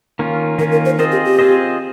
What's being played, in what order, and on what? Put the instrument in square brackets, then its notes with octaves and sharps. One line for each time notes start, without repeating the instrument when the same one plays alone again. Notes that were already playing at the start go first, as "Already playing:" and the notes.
[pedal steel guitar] D#3 A#3 C#4 F4
[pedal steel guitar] D#3 A#3 C#4 F4 [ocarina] A#4
[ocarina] A#4
C5
[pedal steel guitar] C4 F4 G#4 C5 D#5 [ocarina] A#4
[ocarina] G4
G4
[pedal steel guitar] C4 F4 G#4 C5 D#5